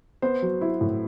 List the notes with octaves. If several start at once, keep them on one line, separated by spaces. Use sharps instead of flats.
B3 C5
F#3
E4
A2